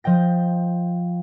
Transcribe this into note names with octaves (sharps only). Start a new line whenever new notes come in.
F3 D#5 G5 A#6